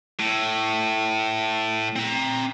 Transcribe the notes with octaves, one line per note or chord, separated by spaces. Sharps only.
A2
C4 A#5